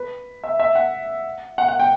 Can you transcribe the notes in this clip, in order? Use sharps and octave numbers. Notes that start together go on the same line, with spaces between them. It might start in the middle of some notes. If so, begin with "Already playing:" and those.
Already playing: B4
E5
E5
F#5
F#5
F#5
G5